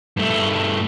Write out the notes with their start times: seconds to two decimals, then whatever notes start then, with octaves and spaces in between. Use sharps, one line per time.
0.17 G2 A3